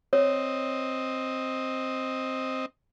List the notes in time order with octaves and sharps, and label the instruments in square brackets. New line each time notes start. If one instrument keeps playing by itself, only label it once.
[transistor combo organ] C4 D#5 [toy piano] C#5